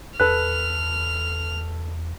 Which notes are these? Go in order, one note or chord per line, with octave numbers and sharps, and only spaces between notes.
E2 A4 B4 F6 F#6